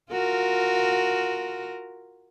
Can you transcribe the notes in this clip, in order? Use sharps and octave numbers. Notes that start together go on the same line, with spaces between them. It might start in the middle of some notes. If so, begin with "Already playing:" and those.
F4 F#4 A#4